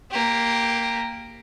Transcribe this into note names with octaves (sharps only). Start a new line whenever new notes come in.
A#3 G4